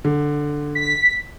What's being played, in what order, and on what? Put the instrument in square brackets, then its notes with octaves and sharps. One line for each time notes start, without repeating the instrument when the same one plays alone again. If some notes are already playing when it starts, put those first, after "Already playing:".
[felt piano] D3
[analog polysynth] B6